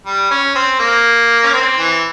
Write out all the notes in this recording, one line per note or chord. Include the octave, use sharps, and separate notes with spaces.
G3
C#4
C4
A#3
C#4
C4
E3